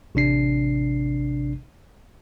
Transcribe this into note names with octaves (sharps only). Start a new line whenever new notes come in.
A1 C3 D4 C7